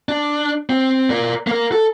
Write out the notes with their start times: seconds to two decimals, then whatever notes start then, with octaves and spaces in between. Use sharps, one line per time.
0.09 D4
0.70 C4
1.10 A#4 D5
1.47 A#3 A#4
1.72 A4